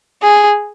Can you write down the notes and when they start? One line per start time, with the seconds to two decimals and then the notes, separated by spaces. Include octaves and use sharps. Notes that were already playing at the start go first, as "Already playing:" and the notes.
0.22 G#4